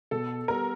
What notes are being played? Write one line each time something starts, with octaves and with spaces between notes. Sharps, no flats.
B2 A4
G3 B3 A#4